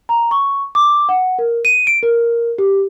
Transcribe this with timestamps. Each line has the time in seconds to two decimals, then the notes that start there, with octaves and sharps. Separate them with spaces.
0.09 A#5
0.31 C#6
0.75 D6
1.09 F#5
1.39 A#4
1.65 D#7
1.87 D7
2.03 A#4
2.58 G4